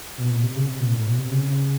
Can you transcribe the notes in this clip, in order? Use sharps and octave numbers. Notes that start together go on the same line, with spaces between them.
B2
A#2
C3
C#3
C3
A#2
A2
B2
C3
C#3
C#3